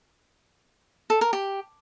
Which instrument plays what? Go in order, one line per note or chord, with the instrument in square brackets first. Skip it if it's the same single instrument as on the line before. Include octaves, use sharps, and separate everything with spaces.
[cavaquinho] A4
A#4
G4